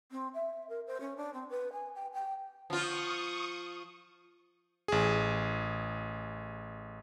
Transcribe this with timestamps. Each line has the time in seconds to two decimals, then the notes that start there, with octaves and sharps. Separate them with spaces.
0.11 C4
0.34 E5
0.69 A#4
0.87 C5
1.00 C#4
1.17 D4
1.33 C4
1.50 B4
1.72 G#5
1.95 G5
2.13 G5
2.70 F3 F4 C#6 D#6
4.88 A1 G#4